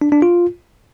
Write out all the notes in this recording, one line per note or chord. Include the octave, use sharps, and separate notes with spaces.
D4
D4
F4